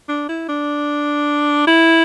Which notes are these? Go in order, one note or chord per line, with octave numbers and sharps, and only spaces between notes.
D4
E4
D4
E4